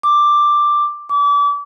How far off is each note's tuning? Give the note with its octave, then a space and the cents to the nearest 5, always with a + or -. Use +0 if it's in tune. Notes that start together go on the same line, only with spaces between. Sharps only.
D6 +5
D6 -35